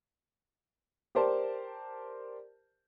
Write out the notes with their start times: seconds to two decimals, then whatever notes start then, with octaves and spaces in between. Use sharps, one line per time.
1.15 G4 A#4 C5 D5 A5